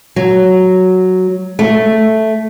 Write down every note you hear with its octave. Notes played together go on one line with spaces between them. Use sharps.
F#3
A3